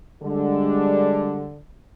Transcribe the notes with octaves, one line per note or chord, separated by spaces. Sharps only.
D3 G3 G#3 D4